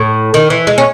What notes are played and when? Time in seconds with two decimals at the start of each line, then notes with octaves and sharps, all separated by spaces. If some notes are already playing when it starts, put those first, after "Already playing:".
Already playing: A2
0.34 D#3
0.50 E3
0.67 G#3
0.78 C#4